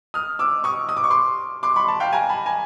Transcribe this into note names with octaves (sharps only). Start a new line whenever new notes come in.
D#6 F6
D6 E6
C#6 D#6
D#6
D6
C#6
C6 D6
C6 D6
B5 C#6
A5 B5
F5 G5
G#5 A#5
A5 B5
G#5 A#5